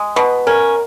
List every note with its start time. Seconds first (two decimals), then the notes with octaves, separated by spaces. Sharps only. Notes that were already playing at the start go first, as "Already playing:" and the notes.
Already playing: G#3
0.16 B2 B4
0.47 C#4 A#4